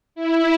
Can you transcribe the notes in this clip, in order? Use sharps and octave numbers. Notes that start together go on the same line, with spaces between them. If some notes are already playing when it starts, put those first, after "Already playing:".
E4